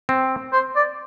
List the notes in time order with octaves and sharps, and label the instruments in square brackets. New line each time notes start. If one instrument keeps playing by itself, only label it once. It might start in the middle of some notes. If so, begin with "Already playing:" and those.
[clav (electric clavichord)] C4
[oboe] C5
D5